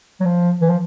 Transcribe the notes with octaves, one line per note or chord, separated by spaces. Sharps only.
F#3
F3
E3
F3